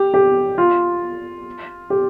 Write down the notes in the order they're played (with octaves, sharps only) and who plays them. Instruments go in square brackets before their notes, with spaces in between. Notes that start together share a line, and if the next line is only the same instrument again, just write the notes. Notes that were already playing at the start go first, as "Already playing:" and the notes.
Already playing: [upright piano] G4
G4
F4
G4